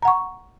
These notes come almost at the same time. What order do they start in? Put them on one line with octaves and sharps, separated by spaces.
A#5 F#5 C#6